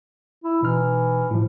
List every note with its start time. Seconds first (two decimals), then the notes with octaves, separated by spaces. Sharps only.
0.44 E4
0.62 B2 E3 D#4 F6
1.31 A2 F3